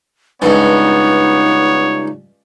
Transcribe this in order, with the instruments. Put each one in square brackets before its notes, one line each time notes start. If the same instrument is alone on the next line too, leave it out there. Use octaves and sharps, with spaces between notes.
[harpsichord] C#2 G2 [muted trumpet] B3 [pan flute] D#4 [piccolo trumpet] C#5